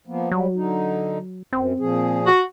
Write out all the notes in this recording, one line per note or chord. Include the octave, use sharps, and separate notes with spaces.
F3 A#3 B3
F#3 G3
D3 D#4
F#2 C4
A#2 F3 G#4
F#4